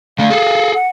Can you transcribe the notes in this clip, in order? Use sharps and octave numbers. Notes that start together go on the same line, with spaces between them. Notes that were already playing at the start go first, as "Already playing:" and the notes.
D3 A3 F5
G#4 A4
F#5